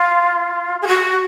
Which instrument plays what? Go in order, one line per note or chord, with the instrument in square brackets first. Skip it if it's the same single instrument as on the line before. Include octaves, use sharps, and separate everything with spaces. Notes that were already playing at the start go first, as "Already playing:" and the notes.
Already playing: [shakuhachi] F4
G#4
F#4